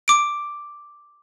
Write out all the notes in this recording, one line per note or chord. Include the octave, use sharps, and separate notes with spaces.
D6 D7